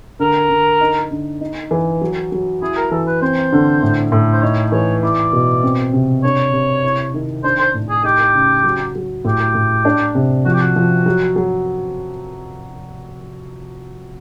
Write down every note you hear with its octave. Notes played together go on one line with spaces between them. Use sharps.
D3 A#4
D3
D#4
D3
D#4
E3
F#3
F#3
E4 G#4
A#4
E3 A4
B4
C4 C5
D3
A2
A2
C5
D#4 C#5
E3 C#5
E4 D5
B2
C4
C3
D4 C#5
C3
E4
D#3
D4 C5
C5
A2
G#4
D#4 G4
C#3
F#3
F#3
A2 G4
A2
D4
C3
F3 F#4
G4
F#4
F3
F#3
F#3